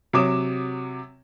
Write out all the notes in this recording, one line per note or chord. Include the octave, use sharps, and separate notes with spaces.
C3 F#3 C#5 D6 D#6 E7